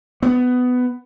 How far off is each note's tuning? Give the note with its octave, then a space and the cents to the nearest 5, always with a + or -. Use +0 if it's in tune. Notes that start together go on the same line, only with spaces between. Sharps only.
B3 +15